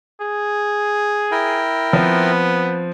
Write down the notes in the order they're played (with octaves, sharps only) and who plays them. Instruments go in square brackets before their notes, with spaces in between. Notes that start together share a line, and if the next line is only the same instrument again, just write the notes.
[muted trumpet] G#4
[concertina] E4 A#4 G5
[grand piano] F3 C4 [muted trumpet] B3